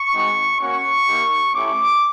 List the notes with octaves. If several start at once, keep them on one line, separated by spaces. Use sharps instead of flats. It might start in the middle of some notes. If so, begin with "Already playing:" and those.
Already playing: C#6
G#3 C4 D#4 F#4
A#3 C#4 F#4 C#6
A#3 D#4 G4
A3 C#4 E4 G4 D6